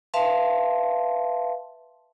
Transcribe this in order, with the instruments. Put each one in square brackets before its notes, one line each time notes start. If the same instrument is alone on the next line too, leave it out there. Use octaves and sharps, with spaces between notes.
[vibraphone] B4 E5 F5 A5 C6